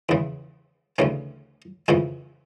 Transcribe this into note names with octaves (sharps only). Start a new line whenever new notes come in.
E2 C#3 E3
D2 C#3 E3 C#4
F2 C#3 E3 C#4